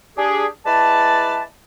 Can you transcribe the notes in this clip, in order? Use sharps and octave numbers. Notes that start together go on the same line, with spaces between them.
D4 G4 G#4
G#3 E4 B4 D5 A5